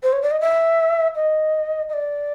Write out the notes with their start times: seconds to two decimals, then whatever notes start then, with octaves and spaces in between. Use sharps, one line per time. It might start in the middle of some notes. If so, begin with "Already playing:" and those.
0.03 C5
0.13 C#5
0.22 D5
0.31 D#5
0.41 E5
1.15 D#5
1.89 D#5
1.93 D5